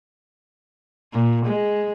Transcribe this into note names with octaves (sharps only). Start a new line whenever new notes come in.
A#2
G#3